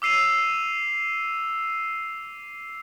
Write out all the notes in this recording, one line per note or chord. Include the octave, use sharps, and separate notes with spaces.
D6 E6 C7 D#7 F7